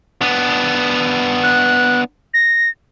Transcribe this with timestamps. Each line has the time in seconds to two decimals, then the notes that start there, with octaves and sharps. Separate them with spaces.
0.22 B3 D4
1.43 F#6
2.34 A#6